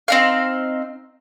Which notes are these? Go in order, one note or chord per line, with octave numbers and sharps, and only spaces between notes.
C4 D#4 F5